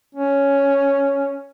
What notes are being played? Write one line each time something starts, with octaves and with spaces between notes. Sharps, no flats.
C#4